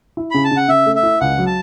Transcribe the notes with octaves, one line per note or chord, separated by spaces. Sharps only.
E4
C#3 B5
A5
C#3
F#5
C#3 E5
A3
E5
E4
C#2 F#5
F#3
A5